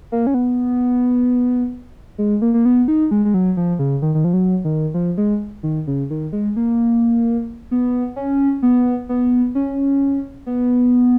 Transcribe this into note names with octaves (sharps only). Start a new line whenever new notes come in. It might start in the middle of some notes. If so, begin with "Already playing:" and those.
A#3
C#4
B3
G#3
A#3
A#3
B3
D#4
G#3
G#3
F#3
F3
C#3
D#3
D#3
F3
F#3
D#3
F3
G#3
D#3
C#3
D#3
G#3
A#3
B3
C#4
B3
B3
C#4
B3